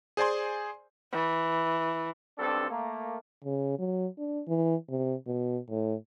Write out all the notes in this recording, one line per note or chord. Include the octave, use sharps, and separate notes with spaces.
G#4 C5 D5 G#5 C6
E3
B1 G2 C4 D4 A4
A3 A#3
C#3
F#3
D4
E3
C3
B2
A2